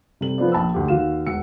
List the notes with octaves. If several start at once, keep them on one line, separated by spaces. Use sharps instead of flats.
C3 G3 A4 F#7
F3 B3 F4 A4 C5 D5
A#1 A5 B5 E6
D2 G4
D#2 F#4 F5 E7
E1 F#5 E6 C#7